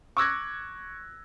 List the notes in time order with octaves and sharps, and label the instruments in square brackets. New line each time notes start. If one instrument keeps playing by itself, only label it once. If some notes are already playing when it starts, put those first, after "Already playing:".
[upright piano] C#6 D6 E6 F#6 G#6 A#6